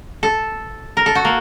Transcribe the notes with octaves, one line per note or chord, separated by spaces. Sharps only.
A4
A#4
A4
F#4
A#3